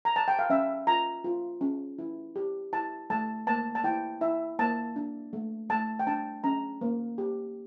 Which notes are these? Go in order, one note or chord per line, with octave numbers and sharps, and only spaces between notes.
A#5
A5
G5
F5
C#4 E5
F4 A#5
F4
C#4
E4
G4
E4 A5
A3 A5
A#3 A5
A5
E4 G5
E4 E5
A#3 A5
D4
A3
A3 A5
G5
D4 A5
C#4 A#5
A#3
G4